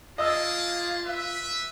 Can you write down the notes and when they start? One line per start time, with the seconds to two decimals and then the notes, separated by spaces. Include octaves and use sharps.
0.18 A#3 F4 G#4 D#5 A5 E6
1.05 B4 E5